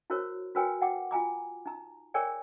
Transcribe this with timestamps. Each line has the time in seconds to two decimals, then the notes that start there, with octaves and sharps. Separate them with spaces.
0.10 E4 F#4 A#4 C5 C#5
0.55 F#4 A#4 B4 C#5 G5 G#5
0.82 F#5 G5 D6
1.11 F4 G#5 A#5 D6
1.66 D#4 A#5
2.14 G#4 A#4 C#5 D5 G5 G#5